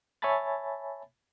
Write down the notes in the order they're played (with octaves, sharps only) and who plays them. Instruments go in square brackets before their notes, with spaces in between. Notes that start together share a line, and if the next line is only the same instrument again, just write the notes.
[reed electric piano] C#5 E5 G#5 A5 B5 A6